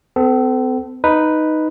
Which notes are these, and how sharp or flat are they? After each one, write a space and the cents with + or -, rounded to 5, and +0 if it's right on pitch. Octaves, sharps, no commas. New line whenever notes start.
C4 -45 A4 +0
D#4 +0 B4 +0